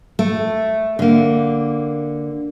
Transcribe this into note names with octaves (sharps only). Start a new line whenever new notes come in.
A3
D3 A#3